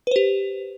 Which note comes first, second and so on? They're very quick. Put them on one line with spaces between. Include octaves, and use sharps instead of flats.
B4 C5 G4